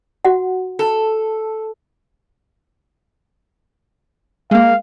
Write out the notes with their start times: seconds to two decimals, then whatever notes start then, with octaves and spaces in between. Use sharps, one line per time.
0.25 F#4 F#5
0.79 A4
4.51 G#3 A#3 F5